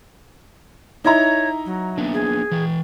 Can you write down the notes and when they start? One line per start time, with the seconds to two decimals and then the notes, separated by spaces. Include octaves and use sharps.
1.04 D#4 E4 C#5 A#5
1.66 F#3
1.98 A#3 B3 D4
2.14 G#4
2.51 E3 G5